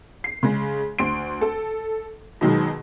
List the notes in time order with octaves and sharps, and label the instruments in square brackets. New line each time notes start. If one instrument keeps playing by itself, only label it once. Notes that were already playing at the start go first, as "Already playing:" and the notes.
[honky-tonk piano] C7
C#3 G#3
D2 C6 D7
A4
B2 D#3 F#3 G#3